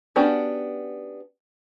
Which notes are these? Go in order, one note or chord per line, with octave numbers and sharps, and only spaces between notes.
B3 C#4 D4 F#4 G4